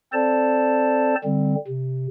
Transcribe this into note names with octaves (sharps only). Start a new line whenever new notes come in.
C4 A4 C5 D5 A5
D3 G3 C4
C3